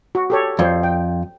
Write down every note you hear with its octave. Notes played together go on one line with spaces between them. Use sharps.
F#4
G4 A4 C#5
F2 C5 D5
G5